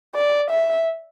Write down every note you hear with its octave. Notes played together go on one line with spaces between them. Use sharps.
D5
E5